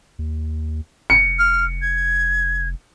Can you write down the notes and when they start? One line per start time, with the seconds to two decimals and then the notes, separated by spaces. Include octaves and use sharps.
0.19 D#2
1.10 F1 C#7
1.39 F6
1.82 G#6